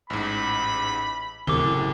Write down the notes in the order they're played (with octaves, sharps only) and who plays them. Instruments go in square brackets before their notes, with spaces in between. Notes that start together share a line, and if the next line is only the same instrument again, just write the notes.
[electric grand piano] A1 G#2 [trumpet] B5
[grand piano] F#1 A2 [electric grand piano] C3 [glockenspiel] D6 G7